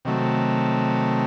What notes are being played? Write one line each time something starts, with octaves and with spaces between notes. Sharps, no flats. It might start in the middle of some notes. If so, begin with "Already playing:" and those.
C3 D#3 F#3 A3